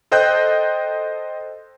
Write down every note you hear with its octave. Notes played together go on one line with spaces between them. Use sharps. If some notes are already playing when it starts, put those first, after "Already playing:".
A4 C5 D#5 G5 F#6 G6